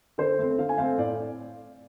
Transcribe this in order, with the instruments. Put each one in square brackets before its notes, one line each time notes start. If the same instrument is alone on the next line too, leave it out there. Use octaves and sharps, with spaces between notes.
[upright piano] D3 C5
A3 C4
D3 F5
G#5
A3 C4 F5
A2 D5